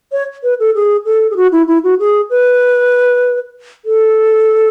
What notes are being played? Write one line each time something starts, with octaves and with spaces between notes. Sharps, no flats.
C#5
B4
A4
G#4
A4
G#4
F#4
E4
E4
F#4
G#4
B4
A4